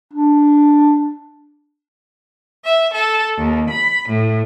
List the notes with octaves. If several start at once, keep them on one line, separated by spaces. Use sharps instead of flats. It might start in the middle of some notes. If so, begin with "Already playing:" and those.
D4
E5
A4
D#2
B5
A2